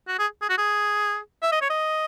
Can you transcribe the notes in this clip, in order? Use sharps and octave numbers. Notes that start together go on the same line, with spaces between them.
F#4
G#4
G#4
F#4
G#4
E5
D#5
C#5
D#5